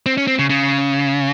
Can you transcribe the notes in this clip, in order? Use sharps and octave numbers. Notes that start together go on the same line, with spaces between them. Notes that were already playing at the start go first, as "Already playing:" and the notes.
C4
C#4
C4
C#3
C#3